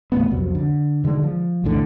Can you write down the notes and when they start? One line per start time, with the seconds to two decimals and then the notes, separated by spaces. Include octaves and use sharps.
0.12 E2 A#2 A3 B3
0.30 C2 F2 F#3
0.55 D3
1.04 B2 D3 D#3 G#3
1.23 F3
1.64 B1 E2 A2 D3